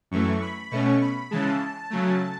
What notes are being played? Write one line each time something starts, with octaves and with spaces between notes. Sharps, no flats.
F#2 E3 A3 C#6
B5
B2 A3 C#4 C#6
B5
C#3 E3 G#3 A5
C#3 F#3 A3